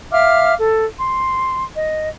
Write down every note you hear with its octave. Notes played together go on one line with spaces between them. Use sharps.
E5 F5 D6 F6
A4
C6
D#5